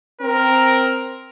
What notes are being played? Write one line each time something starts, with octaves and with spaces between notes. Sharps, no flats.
C4 A#4